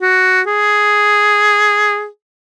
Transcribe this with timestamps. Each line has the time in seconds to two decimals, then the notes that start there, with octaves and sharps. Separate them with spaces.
0.02 F#4
0.47 G#4